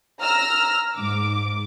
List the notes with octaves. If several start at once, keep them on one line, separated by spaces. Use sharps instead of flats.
A#5 E6 F6 A#6
G#2 D6